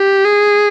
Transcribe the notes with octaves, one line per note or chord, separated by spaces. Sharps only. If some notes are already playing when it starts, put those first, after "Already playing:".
Already playing: G4
G#4